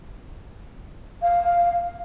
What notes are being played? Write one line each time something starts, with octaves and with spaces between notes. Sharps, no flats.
F5